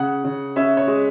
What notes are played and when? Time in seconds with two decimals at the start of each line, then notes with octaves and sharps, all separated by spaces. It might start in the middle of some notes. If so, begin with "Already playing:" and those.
Already playing: C#3 F#5
0.24 C#3
0.56 C#4 E5
0.77 C#5
0.87 G#3